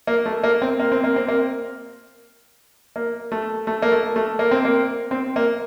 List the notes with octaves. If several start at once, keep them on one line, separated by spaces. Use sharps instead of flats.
A#3
A3
A#3
C4
A#3
C4
A#3
C4
A#3
A#3
A3
A3
A#3
A3
A3
A#3
C4
A#3
C4
A#3